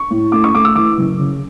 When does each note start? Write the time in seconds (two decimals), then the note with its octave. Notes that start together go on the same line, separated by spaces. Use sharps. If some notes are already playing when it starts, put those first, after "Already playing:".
Already playing: C#6
0.11 A2
0.32 A3 D6
0.44 C#6
0.54 A3 D6
0.65 E6
0.75 E3 D6
0.98 F#1
1.19 C#3